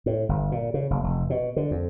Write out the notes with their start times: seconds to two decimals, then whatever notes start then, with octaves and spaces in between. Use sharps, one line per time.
0.06 A2
0.29 G1
0.52 A#2
0.74 C#3
0.90 F#1
1.04 F1
1.30 B2
1.56 D3
1.71 F2